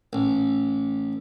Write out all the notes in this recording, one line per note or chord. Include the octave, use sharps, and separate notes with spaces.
A1